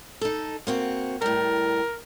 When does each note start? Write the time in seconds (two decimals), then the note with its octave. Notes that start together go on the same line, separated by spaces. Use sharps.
0.21 D#4 A4
0.67 A#3 C4 F#4
1.22 A2 G3 A#4